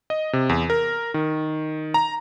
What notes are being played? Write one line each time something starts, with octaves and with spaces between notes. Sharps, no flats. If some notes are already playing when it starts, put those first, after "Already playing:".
D#5
C3
E2
A#4
D#3
A#5